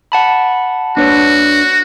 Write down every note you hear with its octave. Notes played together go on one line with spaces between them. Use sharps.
F#5 A5 B5
D4 F#4 B4 C#5